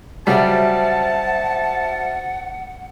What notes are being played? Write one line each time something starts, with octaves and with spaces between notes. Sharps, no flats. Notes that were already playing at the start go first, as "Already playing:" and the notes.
C#3 F#3 G3 C5 E5 F#5 A5